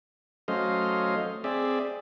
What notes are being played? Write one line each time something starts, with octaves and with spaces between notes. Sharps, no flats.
F#3 A3 C#4 C5 D#5 F5
C4 G#4 D5 E5